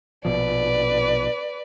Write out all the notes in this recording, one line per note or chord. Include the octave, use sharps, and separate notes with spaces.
A#1 B2 F3 B4 D5